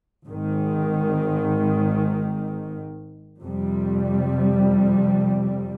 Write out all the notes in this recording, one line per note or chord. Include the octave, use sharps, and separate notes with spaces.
G#1 G#2 D#3
F2 C3 G3